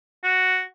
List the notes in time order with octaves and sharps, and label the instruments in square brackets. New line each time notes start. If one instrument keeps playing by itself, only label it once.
[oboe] F#4